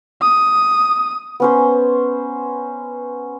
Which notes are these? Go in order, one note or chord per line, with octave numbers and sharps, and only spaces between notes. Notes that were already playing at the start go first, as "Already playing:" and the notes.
D#6
B3 C#4 C5